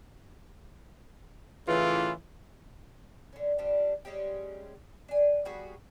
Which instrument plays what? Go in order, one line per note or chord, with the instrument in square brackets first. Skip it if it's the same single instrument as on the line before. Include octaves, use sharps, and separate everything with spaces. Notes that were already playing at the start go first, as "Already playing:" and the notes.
[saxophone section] A2 C#3 E3 [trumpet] F4
[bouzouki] D3 C#4
F3 G3 D4
G3 G#3 C#4 G4
D4 G#5
G3 B3 F#4 G#4